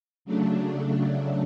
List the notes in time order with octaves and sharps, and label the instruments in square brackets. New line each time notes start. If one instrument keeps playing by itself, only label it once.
[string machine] C#3 F#3 A3 D4